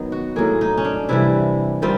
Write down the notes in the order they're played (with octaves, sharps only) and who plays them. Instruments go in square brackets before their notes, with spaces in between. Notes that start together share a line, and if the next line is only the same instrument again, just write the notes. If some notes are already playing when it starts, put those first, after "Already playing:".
Already playing: [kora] D#3 F#3 B3
F#4
A2 F#3 A#3 G#4
D#4
C#4
D4
C3 E3 G3 E4
D#3 G3 C4 F4